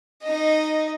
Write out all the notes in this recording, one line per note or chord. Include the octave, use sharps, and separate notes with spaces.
D#4 D#5